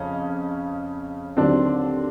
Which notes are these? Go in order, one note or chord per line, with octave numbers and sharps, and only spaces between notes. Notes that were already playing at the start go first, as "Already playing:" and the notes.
Already playing: F2 C#3 C#4
D#2 D3 F#3 C4 D4